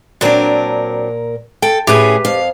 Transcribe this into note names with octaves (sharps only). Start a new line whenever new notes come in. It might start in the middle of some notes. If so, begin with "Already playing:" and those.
A#2 F#3 C4 D4 A#4
A4 G5
A2 C#4 G4 G#4 B4
F2 F5